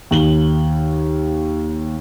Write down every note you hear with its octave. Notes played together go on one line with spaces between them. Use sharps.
D#2 F#7 G7